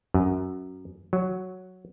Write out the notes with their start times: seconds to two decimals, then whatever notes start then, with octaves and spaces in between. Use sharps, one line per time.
0.14 F#2
1.13 F#3